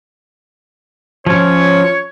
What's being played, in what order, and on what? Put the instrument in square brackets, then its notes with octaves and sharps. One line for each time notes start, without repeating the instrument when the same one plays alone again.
[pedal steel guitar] F3 C#4 [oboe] C#5